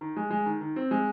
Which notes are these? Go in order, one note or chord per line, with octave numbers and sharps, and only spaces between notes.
D#3
G#3
G#3
D#3
D#3
C4
G#3